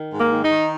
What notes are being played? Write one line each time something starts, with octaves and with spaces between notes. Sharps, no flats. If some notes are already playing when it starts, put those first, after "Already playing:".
Already playing: D#3
G#2
A#3
D#3
D#4
D#3